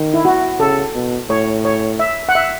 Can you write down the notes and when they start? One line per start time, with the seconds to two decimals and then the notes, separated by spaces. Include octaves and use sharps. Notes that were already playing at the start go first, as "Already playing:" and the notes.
Already playing: D#3
0.14 E4
0.25 F#4
0.59 C#3 A4
0.95 B2
1.30 A2 C#5
1.65 C#5
1.99 E5
2.29 F#5
2.35 E5